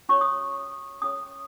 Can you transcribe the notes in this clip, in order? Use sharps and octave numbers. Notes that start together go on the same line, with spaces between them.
C#4 F#4 C#5 C#6
D#6
C#4 G#4 C#5 D#6